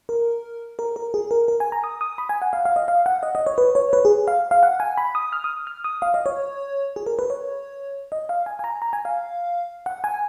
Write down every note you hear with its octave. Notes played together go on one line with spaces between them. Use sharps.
A#4
A#4
A#4
G#4
A#4
A#4
G#5
A#5
D#6
D#6
B5
G#5
F#5
F5
F5
D#5
F5
F#5
D#5
D#5
C#5
B4
C#5
B4
G#4
F5
F5
F#5
G#5
B5
D#6
F6
D#6
F6
D#6
F5
D#5
C#5
G#4
A#4
B4
C#5
D#5
F5
G#5
G#5
A#5
A#5
G#5
F5
F#5
G#5